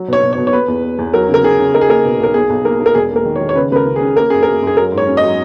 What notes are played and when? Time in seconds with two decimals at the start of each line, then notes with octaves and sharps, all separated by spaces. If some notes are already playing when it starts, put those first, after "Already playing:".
Already playing: F#3
0.08 B2 C#5
0.23 B2
0.33 C#5
0.38 B2
0.47 C#5
0.53 B3 B4
0.68 E2
0.83 B3
0.99 E2
1.13 F#3 A#4
1.29 C#3 A#4
1.43 C#3 G#4
1.59 C#3
1.74 D#4 A#4
1.81 G#4
1.89 A#3 A#4
2.04 B2
2.20 B1 A#4
2.34 B1 G#4
2.50 B1
2.65 A#3 A#4
2.80 A#3
2.86 A#4
2.95 E1 G#4
3.11 A#3 A#4
3.25 D#3
3.36 C#5
3.40 D#3
3.49 C#5
3.55 C#3 B4
3.71 C#2 B4
3.76 A#4
3.86 C#3
3.96 G#4
4.01 C#4
4.16 A#3 A#4
4.30 F#2 G#4
4.43 A#3 A#4
4.62 F#2 G#4
4.77 F#3 A#4
4.92 G#2
4.98 C#5
5.07 C#4
5.17 D#5
5.23 F#3